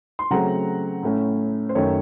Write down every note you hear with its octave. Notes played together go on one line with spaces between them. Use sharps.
C6
C#3 F#3 A3 C4 F#5 A#5
A2 A3 C#4
C5
F#2 D#3 A3 C#5